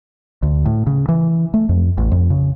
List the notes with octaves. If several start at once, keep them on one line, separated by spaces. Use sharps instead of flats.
D2
A2
C#3
E3
A3
F2
A1
F2
C#3